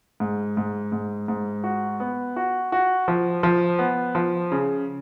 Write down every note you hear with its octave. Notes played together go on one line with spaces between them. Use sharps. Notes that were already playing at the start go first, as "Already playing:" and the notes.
G#2
G#2
G#2
G#2
F#4
B3
F#4
F#4
F3
F3
B3
F3
C#3